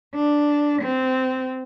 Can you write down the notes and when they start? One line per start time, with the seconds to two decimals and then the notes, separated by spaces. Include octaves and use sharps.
0.14 D4
0.82 C4